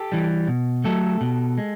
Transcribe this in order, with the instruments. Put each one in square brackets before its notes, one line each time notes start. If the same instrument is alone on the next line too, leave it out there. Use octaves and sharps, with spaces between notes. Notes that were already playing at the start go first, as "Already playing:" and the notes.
Already playing: [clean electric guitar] G4 A4
E3 G3
B2
F#3 A3 G4 A4
B2
G#3